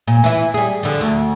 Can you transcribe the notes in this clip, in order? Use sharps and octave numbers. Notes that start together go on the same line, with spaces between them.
A#2
E3 E4
G3 G#4
D3 F3
D2